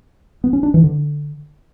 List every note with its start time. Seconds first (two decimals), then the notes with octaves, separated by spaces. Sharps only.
0.44 B3
0.53 C#4
0.63 D4
0.74 E3
0.84 D3